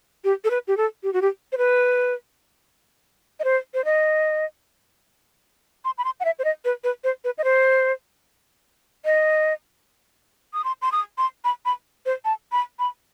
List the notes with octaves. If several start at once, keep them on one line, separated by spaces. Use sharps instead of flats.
G4
A4
B4
G4
A4
G4
F#4
G4
C5
B4
D#5
C5
C5
D#5
C6
B5
C6
F#5
E5
C5
D#5
B4
B4
C5
B4
D#5
C5
D#5
D#6
C6
C6
D#6
C6
B5
B5
C5
A5
B5
B5